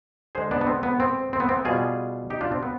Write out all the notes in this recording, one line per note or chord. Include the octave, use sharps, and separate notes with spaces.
D3 G#3 G#4 C5
B3 D4
B3
C4
B3
C4
C4
B3
C4
B2 G3 F4 G#4
D#4 G4
D4 F4
C4
B3